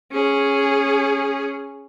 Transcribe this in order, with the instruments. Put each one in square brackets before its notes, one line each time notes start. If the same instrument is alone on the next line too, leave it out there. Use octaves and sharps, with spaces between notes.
[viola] C#4 G#4